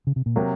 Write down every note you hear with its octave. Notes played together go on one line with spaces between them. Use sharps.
C#3
C3
A#2
C3 F#3 A#3